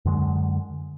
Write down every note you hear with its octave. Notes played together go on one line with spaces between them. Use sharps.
F#2 D3 G#3